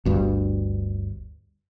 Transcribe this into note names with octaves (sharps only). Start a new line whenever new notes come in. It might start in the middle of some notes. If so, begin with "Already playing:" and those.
G1 D2 G2